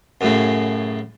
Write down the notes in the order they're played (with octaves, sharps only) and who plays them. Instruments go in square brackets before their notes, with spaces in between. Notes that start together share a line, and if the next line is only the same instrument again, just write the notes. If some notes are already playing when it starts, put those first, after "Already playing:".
[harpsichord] F#2 A2 C#3